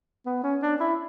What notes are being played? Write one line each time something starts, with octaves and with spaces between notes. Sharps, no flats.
B3
C#4
D4
E4